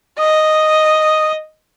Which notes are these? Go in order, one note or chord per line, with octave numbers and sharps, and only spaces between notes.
D#5 D#6